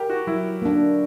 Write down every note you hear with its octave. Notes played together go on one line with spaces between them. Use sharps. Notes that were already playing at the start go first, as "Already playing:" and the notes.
Already playing: G4 A#4
F#4
F#3 E4
A#3 D4